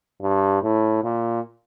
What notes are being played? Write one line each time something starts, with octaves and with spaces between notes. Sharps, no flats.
G2
A2
A#2